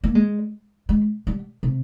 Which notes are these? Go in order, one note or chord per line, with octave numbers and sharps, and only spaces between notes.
A#3
G#3
G#3
G3
C3